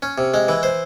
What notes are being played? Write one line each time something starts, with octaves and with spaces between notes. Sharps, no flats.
C#4
C3
G#3
E3
C5